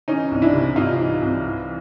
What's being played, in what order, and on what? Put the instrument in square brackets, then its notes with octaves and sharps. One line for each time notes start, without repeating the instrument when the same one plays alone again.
[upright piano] E3 C#4 D#4
C2
D4 E4
C3
C2 D#4 F4
E3
C2
E3